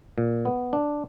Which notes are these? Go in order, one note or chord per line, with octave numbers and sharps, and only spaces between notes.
A#2
B3
D4